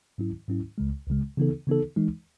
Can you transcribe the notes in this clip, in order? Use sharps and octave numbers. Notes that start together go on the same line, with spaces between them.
G#2 F#3 C#4 E4
G#2 F#3 C#4 E4
C#2 C#3 G#3
C#2 C#3 G#3
C#3 E3 B3 D#4 A4
C#3 E3 B3 D#4 A4
E3 G#3 D#4